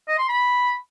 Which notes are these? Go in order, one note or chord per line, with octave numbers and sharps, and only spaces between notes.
D#5
C6
B5